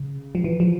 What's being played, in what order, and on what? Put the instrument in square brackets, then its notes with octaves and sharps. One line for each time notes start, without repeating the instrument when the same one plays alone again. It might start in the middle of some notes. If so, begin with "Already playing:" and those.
Already playing: [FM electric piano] C#3
F3
E3
F3